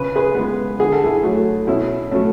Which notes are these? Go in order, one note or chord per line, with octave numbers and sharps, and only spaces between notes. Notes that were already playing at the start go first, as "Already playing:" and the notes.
Already playing: C#3 B4
G#4 B4
G#3 B3
D3 G#4
A4
E4 G#4
F#3 A3
B2 C#4 E4
F#3 A3 C#4